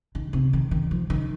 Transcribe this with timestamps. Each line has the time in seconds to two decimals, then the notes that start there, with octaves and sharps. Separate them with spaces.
0.15 D#3
0.33 C3
0.53 D#3
0.71 D#3
0.91 F3
1.10 D#3